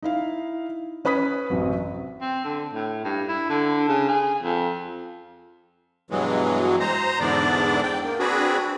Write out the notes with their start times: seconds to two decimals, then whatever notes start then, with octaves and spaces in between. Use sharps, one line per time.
0.02 D#4 E4 F5
1.05 C#4 B4 B5 D#6 B6
1.50 A1 F#2 C3 F#3
2.21 C4
2.44 D3
2.73 A2
3.04 G2
3.28 E4
3.49 D3
3.88 C#3
4.08 G#4
4.43 F2
6.11 G2 B2 E3 F#3 G#3
6.80 C5 A#5
7.20 E2 G#2 D3 B3 D4 D5
7.83 G5
8.03 A#3
8.19 C4 D4 F#4 G#4 B4